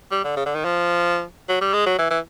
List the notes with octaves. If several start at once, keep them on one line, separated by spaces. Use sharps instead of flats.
G3
D3
C#3
D3
D#3
F3
F#3
G3
G#3
F#3
E3
E3